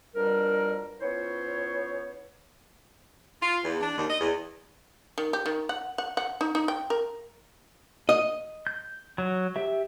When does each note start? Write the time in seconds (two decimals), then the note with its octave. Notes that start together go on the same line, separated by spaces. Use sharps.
0.15 F2 B2 G3 D4 A#4
1.01 B3 C#4 E4 F4 C5 C#5
3.42 F4
3.63 E2
3.80 D4
3.97 D#2
4.09 D#5
4.21 E2
5.18 D#3
5.33 G4
5.46 D#3
5.69 F#5
5.98 F#5
6.17 F#5
6.41 D#4
6.55 D#4
6.68 G5
6.90 A#4
8.09 D#5
8.67 G6
9.18 F#3
9.56 G4 E5